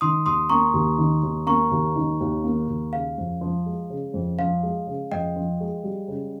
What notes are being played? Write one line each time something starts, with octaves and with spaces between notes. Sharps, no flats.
D#3 C6 D#6
D#2 C6 D#6
A#3 A#5 C#6
D#2
D#3
D#2
A#3 A#5 C#6
D#2
D#3
D#2
A#3
D#2
C#3 F5
F2
F3
G#3
C#3
F2
F3 F5
G#3
C#3
F2 D#5 G5
F3
G#3
G3
C#3